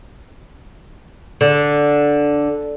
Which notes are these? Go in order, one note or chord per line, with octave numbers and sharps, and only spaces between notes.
D3